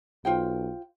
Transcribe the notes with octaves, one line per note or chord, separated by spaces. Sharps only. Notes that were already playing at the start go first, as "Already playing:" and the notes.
B1 F4 C5 G5